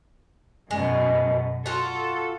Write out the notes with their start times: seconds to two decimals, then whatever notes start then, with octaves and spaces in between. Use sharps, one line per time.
0.71 F#2 B2 G#3
1.66 F4 F#4 A4